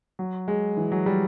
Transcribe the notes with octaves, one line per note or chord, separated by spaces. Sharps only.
F#3
G#3
E3
F#3
G3